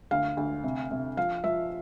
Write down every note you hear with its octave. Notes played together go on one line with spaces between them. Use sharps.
D2 F5
D2
C3
C3
F3 F5
F3 E5